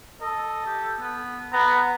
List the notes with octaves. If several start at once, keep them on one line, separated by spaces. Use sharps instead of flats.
A4 D#5
G4
B3
B3 A#5